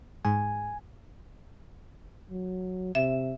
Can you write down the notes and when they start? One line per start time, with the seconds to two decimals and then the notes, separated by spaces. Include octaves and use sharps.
0.25 G#2 G#5
2.30 F#3
2.95 C3 E5